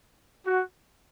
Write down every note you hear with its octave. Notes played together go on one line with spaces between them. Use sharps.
F#4